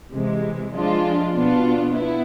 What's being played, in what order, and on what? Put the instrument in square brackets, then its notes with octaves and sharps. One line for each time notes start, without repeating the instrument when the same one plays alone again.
[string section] C3 E3 G#3
F3 G#3 D4 F4
B2 B3 D4 F4
B3 E4